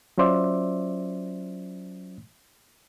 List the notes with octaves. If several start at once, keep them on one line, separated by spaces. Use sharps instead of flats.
F#3 C#4 F4 C5 D5 E5